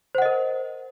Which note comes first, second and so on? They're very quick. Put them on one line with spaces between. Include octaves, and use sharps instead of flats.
C5 F#5 D#5 A#4